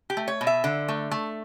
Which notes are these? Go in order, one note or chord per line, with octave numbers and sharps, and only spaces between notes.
G4
A3
C#5
B2
E5
D3
A3
A3